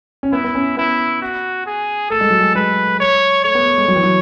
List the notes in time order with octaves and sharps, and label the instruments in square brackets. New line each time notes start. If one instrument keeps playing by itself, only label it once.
[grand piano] C#4
[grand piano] B3 [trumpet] E4
[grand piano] B3
C#4
[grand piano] B3 [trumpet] E4
[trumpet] F#4
G#4
[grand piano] A3 [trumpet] A4
[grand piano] G#3
F#3
G#3
[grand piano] G#3 [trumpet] B4
[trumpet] C#5
[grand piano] A3 [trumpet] C#5
[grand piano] B3
A3
G#3
F#3
E3
F#3